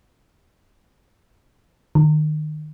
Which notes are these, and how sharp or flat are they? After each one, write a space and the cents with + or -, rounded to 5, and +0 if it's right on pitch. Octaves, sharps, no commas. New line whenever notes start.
D#3 -30